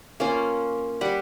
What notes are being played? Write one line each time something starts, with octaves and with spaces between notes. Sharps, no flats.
A#3 C#4 F4
G3 F#5 B5